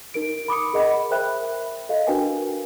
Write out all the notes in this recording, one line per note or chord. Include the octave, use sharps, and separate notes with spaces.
D#4 A#4 D7
B5 D6 D#6 C#7
G#4 A#4 D#5 F#5 B5
A#4 C5 E5 G5 B5 F#6
A4 D#5 F5
D4 F#4 A#4 B4 G5 G#5